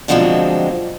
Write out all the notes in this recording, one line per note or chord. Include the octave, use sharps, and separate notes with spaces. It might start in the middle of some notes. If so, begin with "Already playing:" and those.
B2 D3 F3 F#3 G#3 C4